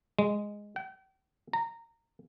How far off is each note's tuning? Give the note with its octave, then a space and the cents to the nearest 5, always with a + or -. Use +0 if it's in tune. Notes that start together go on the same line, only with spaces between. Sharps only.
G#3 -5
G5 -40
A#5 -20